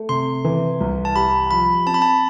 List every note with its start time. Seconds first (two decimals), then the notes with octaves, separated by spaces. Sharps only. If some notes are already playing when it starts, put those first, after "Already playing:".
Already playing: A3
0.09 C3 C6
0.44 E3
0.81 C2
1.05 A5
1.16 G4 B5
1.51 F3 B5
1.86 C4 A5
1.94 B5
2.02 A5